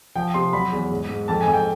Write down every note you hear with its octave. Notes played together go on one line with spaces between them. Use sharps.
F3 G5
C3 C6
F#3 B5
E2
G#2
G#2
F2 A5
G#5
F2
G5